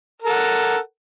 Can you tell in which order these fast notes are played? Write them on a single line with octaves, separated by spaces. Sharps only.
A#4 A4 F#5